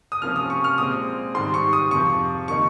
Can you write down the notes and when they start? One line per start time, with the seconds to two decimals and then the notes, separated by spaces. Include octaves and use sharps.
0.12 D#6
0.22 C3 F3 A#3 C#4 F6
0.36 D#6
0.50 C#6
0.64 F6
0.78 A#2 G#3 C4 D#6
1.35 G#2 D#3 G3 C6
1.54 C#6
1.73 D#6
1.91 F2 C3 F3 C#6
2.48 D#3 A#3 D#4 C#6